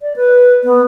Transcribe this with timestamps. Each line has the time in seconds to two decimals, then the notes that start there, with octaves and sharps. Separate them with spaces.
0.01 D5
0.16 B4
0.64 B3